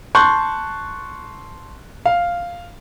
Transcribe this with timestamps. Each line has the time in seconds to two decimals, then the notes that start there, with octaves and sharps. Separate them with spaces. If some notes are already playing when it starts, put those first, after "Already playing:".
0.15 A5 C6 C#6 F#6 G6
2.06 F5